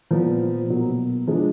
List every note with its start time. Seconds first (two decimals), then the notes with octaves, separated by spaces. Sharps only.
0.11 A#2 F3 B3
0.68 B2 F#3 A#3
1.27 F3 G#3 D4